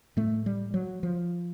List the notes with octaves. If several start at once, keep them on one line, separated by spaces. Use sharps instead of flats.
A2 A3
G3
F#3
F3